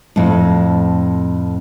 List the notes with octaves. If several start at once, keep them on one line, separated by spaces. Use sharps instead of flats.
F2 A2